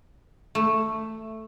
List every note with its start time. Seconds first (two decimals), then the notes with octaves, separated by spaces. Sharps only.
0.55 A3